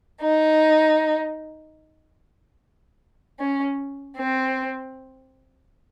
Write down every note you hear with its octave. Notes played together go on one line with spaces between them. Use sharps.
D#4
C#4
C4